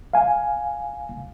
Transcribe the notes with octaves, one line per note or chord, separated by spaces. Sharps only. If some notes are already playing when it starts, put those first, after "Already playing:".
F5 G#5